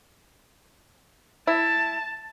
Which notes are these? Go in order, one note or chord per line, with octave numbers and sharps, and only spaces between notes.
E4 A5